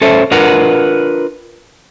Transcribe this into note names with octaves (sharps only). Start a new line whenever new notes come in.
C#4 A4 C5 E5
D4 F4 A#4 B4 F#5